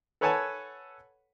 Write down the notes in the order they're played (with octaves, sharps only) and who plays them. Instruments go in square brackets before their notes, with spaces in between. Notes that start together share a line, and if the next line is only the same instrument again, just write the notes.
[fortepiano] A4 B4 C#5 F#5 G#5 A5